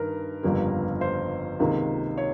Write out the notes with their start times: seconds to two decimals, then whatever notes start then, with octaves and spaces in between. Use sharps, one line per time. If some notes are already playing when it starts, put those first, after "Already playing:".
Already playing: G2 D#3 A#4
0.43 G1 F2 C#3 G3 A#3
1.01 C5
1.59 C#2 C3 D#3 A#3
2.18 C#5